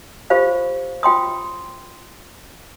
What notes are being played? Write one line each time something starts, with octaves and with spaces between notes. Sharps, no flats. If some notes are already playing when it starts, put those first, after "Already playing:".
F4 G4 A4 C5 F5
F4 G5 C6 D#6